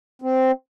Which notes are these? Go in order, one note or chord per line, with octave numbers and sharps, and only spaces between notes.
C4